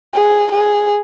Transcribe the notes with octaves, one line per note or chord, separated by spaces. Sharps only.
G#4
G#4